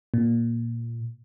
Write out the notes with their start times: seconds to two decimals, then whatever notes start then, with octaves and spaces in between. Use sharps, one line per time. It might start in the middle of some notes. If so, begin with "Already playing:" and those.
0.14 A#2